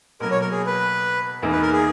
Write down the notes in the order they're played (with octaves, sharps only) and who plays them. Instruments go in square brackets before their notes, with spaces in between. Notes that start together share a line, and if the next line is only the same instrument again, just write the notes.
[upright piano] B2 F#3 A#3 [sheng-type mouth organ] A#4
[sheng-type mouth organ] C#5
A#4
G#4
B4
[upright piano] E2 D#3 A#3 D#4
[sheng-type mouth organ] B4
A#4
G#4